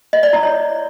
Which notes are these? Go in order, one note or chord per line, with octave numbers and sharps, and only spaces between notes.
D#5
D5
E4
C#5